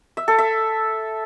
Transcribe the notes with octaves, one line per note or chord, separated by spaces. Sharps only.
E5
A4
E5